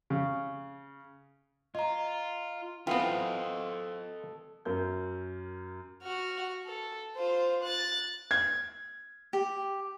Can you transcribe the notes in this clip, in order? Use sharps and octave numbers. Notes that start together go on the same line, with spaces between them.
C#3
F4 D#5 A#5
E3 B3 C4 F4 A4 D#5 G5
F#2 A#4 G6
F#4 F6
A4
F4 C5
F#6 A6
G#6
G4